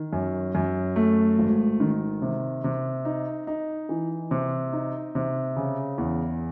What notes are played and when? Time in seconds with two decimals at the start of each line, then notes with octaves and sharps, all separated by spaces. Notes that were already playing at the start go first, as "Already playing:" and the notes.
Already playing: D#3
0.13 F#2
0.55 F#2
0.96 A3
1.39 G#1
1.80 D#3
2.22 C3
2.64 C3
3.05 D#4
3.47 D#4
3.89 E3
4.31 C3
4.73 D#4
5.15 C3
5.56 C#3
5.98 E2